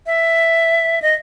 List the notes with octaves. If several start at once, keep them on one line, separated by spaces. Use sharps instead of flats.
E5
D#5